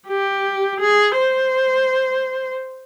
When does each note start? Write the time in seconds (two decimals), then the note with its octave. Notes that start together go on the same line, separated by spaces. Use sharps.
0.08 G4
0.81 G#4
1.18 C5